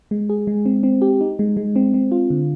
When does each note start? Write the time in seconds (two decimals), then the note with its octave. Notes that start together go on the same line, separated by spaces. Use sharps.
0.11 G#3
0.29 G#4
0.47 G#3
0.66 C4
0.83 C4
1.02 G4
1.21 D#4
1.39 G#3
1.57 G#3
1.76 C4
1.94 C4
2.12 F4
2.30 D3